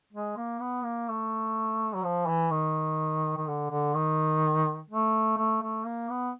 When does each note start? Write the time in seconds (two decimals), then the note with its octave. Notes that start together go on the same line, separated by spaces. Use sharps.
0.13 G#3
0.37 A#3
0.61 B3
0.84 A#3
1.08 A3
1.95 F#3
2.04 F3
2.28 E3
2.51 D#3
3.37 D#3
3.47 D3
3.70 D3
3.95 D#3
4.90 A3
5.37 A3
5.62 A3
5.85 A#3
6.10 B3